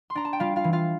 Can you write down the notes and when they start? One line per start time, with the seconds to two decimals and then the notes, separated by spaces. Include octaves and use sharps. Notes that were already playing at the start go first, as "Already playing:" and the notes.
0.10 C6
0.15 D4 A#5
0.25 A5
0.33 G5
0.40 G3 F4 F5
0.56 F4 F5
0.64 E3
0.73 F4 F5